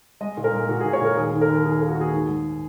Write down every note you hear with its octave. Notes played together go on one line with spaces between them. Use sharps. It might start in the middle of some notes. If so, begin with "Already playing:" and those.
G#3 D#5
A#2
A#4
G#3
A#2 F#4
G#4
A#2
C#5
A#2 A#4
D#2 G#4
D#3
A#4
D#2
D#3 G#4
A#3
F#4
D#2 G#4
G#2
G#2